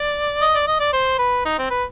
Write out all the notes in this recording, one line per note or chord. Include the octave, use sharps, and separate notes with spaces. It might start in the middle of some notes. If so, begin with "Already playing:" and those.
Already playing: D5
D#5
D5
D#5
D5
C5
B4
D#4
C4
B4